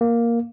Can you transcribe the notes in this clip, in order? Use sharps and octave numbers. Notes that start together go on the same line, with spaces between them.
A#3